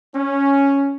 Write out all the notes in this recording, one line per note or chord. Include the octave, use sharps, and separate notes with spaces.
C#4